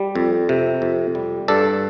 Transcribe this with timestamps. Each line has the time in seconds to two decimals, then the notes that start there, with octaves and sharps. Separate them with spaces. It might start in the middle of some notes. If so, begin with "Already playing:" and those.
Already playing: G3
0.15 F2
0.49 C3
0.82 F2
1.15 G3
1.48 G2 A4 D5